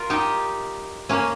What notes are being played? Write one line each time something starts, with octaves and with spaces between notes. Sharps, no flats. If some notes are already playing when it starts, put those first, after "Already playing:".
Already playing: F4 A#4
D#4 G4
A#3 C#4